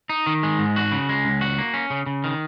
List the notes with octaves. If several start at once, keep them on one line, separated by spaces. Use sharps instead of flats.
D#4
D#3
G#3
G#2
F#4
C#3
G#3
C#2
F#4
A#3
C#4
C#3
C#3
D#3